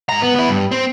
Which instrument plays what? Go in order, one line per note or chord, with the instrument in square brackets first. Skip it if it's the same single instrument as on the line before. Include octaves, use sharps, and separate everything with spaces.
[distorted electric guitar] G#2 A#5
B3
B3 E4
G2
C4